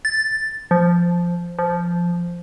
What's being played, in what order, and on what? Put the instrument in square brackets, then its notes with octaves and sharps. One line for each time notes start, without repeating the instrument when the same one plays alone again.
[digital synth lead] A6
F3
F3